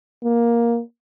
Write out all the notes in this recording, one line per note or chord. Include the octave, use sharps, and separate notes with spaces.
A#3